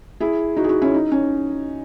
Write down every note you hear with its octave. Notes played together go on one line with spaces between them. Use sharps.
E4 G#4
D#4 F#4
G#4
D#4 F#4
C#4 E4
D#4
C#4